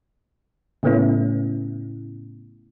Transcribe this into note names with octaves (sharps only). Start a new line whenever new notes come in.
A2 C#3 A3 B3 C#4 E4